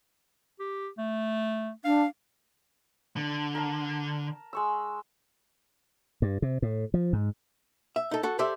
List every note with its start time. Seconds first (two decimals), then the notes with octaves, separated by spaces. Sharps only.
0.60 G4
0.98 A3
1.85 D4 F5
3.17 D3
3.55 A#4 A5
4.53 G#3 C#6 E6
6.22 G2
6.42 C3
6.62 A2
6.94 F3
7.13 G#2
7.96 E5
8.11 D#4 A4
8.23 F#4 A4
8.39 G4 A4 C5 D5 E5